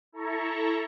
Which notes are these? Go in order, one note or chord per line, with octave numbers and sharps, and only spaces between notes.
E4 A4 A#5 C#6